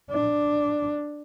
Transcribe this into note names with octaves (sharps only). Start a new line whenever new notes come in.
D4